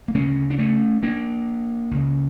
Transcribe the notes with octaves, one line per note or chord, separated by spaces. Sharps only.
A#3
D2 C#3 A3 C#4
D4
A3 C#4
A#3 D4
C#2 C#3